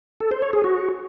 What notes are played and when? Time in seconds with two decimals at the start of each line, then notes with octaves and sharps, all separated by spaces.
0.20 A4
0.31 C5
0.42 C#5
0.53 G#4
0.64 F#4